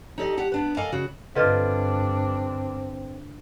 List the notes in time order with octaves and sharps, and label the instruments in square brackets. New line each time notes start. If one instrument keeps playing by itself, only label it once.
[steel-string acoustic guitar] D#4 G4 A4 D5 D#5
G4 F#5 A5
B3 D4 B4
A4 A#4 D5 D#5 F5 G#5
C#3 F#4
[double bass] G2 D4 [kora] D3 F4 [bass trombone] C4 [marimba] B4 D#5 F6